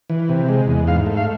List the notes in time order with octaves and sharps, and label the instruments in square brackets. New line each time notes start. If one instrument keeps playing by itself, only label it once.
[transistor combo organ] E3
C3
G#3
E2
G#2 F5
A3
F5